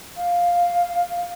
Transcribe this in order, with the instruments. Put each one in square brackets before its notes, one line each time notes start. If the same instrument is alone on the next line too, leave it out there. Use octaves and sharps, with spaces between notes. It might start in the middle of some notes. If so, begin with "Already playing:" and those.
[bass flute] F5